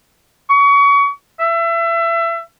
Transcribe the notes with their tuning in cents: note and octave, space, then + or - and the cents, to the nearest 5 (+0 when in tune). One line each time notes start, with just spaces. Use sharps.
C#6 +30
E5 +30